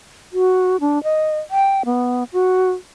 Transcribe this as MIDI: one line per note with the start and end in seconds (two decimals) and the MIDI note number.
0.33 0.77 66
0.80 1.02 62
1.03 1.39 75
1.51 1.82 79
1.85 2.24 59
2.33 2.71 66